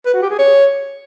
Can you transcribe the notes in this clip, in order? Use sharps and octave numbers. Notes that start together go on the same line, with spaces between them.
B4
F#4
G4
G#4
C#5